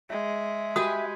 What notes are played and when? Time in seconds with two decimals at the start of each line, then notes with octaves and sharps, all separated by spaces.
0.10 G#3 E5
0.76 F#4 G4 B4 G#5 D#6